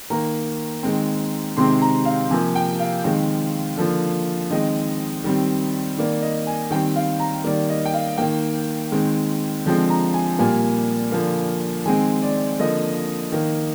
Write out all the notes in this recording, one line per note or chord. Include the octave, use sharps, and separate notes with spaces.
D#3 A#3 A#5
D#3 G#3 C4
C3 D#3 G#3 C4 C6
A#5
F5
C3 F3 A#3 G#5
G5
F5
D#3 G#3 C4
D3 F3 A#3
D#3 G#3 C4 D#5
D#3 G3 C4
D#3 A#3 D5
D#5
G#5
D#3 G3 C4 G5
F5
A#5
D#3 G3 A#3 D5
D#5
G5
F5
D#3 A#3 G5
D#3 G#3 C4
D3 F3 G#3 C4
A#5
G#5
A#2 G3 A#3 G#5
D3 F3 A#3
D#3 G#3 C4 G#5
D5
D3 F3 A#3 D#5
D#3 A#3